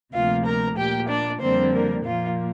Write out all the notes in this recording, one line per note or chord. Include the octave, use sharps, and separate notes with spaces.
D2 C3 F3 A#3 F4 F5
A#4 A#5
A#2 A#3 G4 G5
D4 D5
F2 D3 G3 A#3 C4 C5
A#3 A#4
A#2 F3 A#3 F4